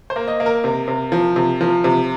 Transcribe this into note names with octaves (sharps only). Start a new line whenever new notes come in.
C5
A#3
D#5
A#3
A#4
C3
C3
F3
C3
F3
C3